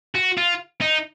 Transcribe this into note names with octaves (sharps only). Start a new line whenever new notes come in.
F#4
F4
D#4